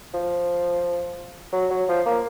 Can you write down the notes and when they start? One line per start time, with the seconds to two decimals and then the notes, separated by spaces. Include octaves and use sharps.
0.14 F3
1.53 F#3
1.70 F#3
1.88 F3
2.06 A#3